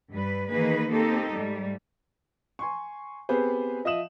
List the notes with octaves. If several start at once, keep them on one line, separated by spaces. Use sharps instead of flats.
G2 G3 B4
D#3 E3 A#3 D#4 G#4 B4
A#3 C4 D#4 G4 A4
G#2 G3 A3
G#5 C6 C#6
B3 C4 G4 G#4 B4 C5
F3 D#5 E5 D#6 E7 F#7